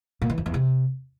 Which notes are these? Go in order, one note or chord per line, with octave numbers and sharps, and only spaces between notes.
A#2
E3
F2
E2
C3